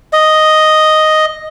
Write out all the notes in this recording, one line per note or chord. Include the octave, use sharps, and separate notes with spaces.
D#5